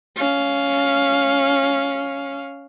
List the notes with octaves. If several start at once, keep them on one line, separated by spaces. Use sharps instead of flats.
C#4 F5